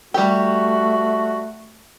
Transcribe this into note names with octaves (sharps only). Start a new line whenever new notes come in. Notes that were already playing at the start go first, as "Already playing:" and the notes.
G3 A3 F#4 G4